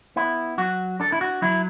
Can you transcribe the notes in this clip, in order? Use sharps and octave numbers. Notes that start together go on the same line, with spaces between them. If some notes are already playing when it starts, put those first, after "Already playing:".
B3 E4
F#3 F#4
D4 A4
E4
F#4
F#3 E4